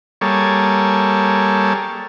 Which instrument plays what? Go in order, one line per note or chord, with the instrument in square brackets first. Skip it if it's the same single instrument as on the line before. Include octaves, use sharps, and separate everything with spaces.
[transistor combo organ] G3 A#3 G#4 A4 C#5